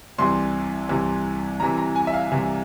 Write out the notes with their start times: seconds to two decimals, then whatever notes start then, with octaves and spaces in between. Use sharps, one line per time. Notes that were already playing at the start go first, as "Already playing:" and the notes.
0.18 C2 C3 E3 C6
0.89 C2 C3 E3
1.60 C2 C3 E3 A#5
1.78 A#5
1.96 G#5
2.07 E5
2.14 F5
2.32 C2 C3 E3